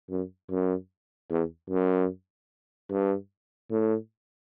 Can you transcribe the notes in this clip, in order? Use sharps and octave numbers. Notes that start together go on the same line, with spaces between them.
F#2
F#2
E2
F#2
G2
A2